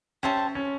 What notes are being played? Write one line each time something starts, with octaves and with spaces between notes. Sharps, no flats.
C#4 G4 C5 E5 A5
C#4